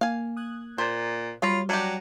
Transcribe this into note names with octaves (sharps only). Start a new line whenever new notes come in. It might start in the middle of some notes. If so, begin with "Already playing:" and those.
A#3 F5 G#5
D#6 F#6 G#6
A#2 C5
F#3 G3 F4 C#5 A#5 B5
F#3 D4 G4 A#6 D#7